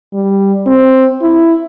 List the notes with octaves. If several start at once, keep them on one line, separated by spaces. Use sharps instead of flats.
G3
C4
E4